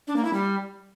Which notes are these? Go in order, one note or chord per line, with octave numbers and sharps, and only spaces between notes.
D4
A#3
E4
G3